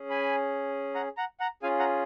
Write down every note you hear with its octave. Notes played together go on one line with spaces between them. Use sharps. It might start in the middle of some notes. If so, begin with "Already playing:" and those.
Already playing: C#4 G#4
G#5 B5
F#5 A#5
F#5 A#5
F#5 A#5
C#4 F4 G#4 F5 G#5
F#5 A#5